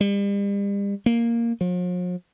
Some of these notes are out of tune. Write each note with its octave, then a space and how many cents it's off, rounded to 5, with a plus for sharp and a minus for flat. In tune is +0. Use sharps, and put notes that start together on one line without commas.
G3 +40
A#3 +0
F3 +45